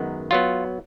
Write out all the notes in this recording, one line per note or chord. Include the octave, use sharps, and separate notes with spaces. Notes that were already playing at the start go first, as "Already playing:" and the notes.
Already playing: F#2 D#3 G#3 B3
F#3 B3 F4